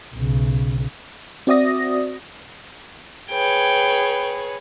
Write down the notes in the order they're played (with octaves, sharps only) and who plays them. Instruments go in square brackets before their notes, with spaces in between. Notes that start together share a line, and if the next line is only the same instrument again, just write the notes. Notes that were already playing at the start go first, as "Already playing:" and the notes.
[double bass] B1 C#3
[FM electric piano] C4 F#4 D5 E5 D#6 A#6
[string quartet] G#4 B4 C#5 [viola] G5